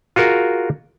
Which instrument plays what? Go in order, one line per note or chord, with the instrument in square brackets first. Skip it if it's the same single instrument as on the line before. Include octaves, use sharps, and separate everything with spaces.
[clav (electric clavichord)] F4 F#4 G#4 A#4